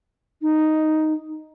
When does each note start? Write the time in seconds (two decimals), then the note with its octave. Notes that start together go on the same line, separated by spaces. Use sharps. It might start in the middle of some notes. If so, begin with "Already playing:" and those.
0.41 D#4